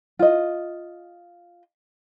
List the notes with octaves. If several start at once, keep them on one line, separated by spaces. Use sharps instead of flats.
F4 D#5